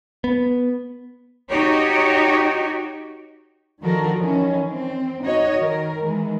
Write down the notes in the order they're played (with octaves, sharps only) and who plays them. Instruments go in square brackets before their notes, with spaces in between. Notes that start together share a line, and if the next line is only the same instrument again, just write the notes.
[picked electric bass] B3
[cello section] D#4 F#4 G4 C#5
D3 D#3 F3 F#4 A4 A#4
D#3 E3 C#4
C4
D#4 F#4 C#5 D#5
D#3 A#4
D#3 E3 G#3